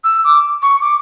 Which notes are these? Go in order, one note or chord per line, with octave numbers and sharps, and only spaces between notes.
E6
D6
C#6
D6